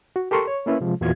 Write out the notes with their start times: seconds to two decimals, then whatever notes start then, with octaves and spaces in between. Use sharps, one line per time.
0.16 F#4
0.31 G4 A4 A#4 C6 C#6
0.48 C#5
0.66 A#3 C#4 E4 B4
0.81 C3 F3 G#3
1.01 E2 A#2 E3 F4 F#4 G#6